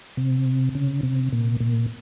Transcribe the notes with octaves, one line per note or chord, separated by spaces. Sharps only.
C3
C#3
C3
A#2
A#2